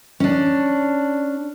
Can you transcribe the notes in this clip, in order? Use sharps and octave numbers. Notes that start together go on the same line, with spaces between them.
C#4 D4